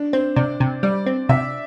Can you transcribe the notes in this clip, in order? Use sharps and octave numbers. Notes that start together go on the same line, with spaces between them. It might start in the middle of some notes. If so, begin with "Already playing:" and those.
Already playing: D4
C4 C5
C3 D5
C3
G3 D5
C4
C3 E5